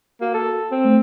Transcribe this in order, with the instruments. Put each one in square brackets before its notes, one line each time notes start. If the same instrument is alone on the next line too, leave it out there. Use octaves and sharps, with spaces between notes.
[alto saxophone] A#3 [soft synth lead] F#4
[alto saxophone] A4
C4
[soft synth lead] A3